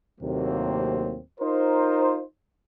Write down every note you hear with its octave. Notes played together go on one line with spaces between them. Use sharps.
D#2 A2 C3 F#3 A#3 C4
D#4 F4 A#4 C5